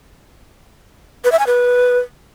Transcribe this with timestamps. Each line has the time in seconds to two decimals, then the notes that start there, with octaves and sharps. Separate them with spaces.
1.24 B4
1.32 E5
1.39 G#5
1.47 B4